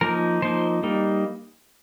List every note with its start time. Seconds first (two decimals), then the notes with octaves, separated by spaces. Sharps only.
0.01 F3 A#3 D#4 A#4
0.42 F3 A#3 D#4 C5
0.83 G3 A#3 D#4